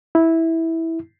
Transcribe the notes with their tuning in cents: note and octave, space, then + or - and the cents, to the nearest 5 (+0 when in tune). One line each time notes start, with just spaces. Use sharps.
E4 -10